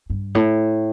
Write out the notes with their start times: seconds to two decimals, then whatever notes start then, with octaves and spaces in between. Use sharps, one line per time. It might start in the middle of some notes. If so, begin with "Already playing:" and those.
0.10 G2
0.35 A2